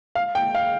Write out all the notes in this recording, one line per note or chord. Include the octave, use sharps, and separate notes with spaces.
F5
G5
F5